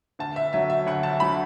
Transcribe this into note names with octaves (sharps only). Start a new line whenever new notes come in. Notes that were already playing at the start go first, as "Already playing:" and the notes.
D2 A5
E5
D3 F#3 E5
E5
D2 F#5
A5
D3 F#3 B5